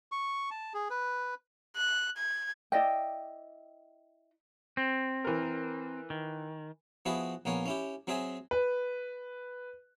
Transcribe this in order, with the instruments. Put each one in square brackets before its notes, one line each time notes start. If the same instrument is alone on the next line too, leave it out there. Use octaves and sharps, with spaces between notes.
[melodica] C#6
A5
G#4
B4
[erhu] F#6
G#6
[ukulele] E4 D5 D#5 G5
[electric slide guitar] C4
[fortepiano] E3 A#4
[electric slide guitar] D#3
[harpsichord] F3 B3 E4 F#4 G#4 B4
A#1 A#3 B3 C#5 G#5
C#4 E4 G4
F#3 C4 G#4 E5 G#5
[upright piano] B4